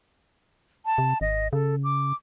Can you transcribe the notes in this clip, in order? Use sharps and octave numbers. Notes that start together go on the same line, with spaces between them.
A5
C3
G#1 D#5
C#3 A4
D6